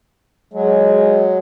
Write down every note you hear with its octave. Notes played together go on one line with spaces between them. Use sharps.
F#3 G#3